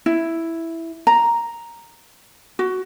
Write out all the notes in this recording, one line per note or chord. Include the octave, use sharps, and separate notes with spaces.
E4
A#5
F#4